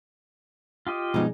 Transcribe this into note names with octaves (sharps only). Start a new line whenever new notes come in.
F4 G4 D#5
B2 F3 G#3 B3 D#4